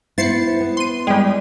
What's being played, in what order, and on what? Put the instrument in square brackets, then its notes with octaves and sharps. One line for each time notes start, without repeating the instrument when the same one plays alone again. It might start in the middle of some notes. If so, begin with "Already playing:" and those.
[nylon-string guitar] B3 E4 C5 [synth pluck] A6 C7 C#7
[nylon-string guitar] B3
[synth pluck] C6 D#7
[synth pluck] G3 G#3 [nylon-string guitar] G5